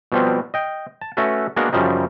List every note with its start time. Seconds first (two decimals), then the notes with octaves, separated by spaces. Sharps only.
0.12 B2 F3 G3 B3 C4
0.54 D#5 G5
1.01 A5
1.17 A3 C#4 F#4 A4 B4
1.56 G#3 A#3 B3 D4 F#4 A#4
1.73 F#2 C#3 F3 G3 D#4